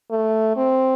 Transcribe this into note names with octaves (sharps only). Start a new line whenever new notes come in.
A3
C4